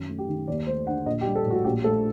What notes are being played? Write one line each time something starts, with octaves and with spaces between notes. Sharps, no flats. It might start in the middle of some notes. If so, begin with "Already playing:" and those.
Already playing: F#2 D#3
A3
G4
D#3
D#2 D5
A3 C5
D3 F#5
A#1 D#5
G4
G3
A4
A2
F#4
A#1 G4
A3 A4